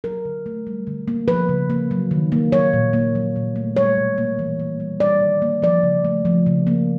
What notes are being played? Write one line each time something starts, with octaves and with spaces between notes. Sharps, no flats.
F#3 A#4
D3
A3
G3
D3
A#3
F3 B4
C#3
A#3
F#3
D#3
A#3
F#3 C#5
A#2
A#3
F#3
A#2
A3
G3 C#5
B2
A#3
E3
A#3
G3
G3 D5
D#3
A#3
F3 D5
C#3
A3
F3
C#3
A#3